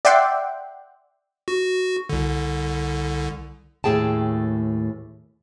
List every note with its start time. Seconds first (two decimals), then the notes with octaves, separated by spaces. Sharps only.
0.05 D5 E5 F#5 G5 C6
1.48 F#4
2.09 C2 D3
3.84 D#2 A2 A3 G#4 G5 A5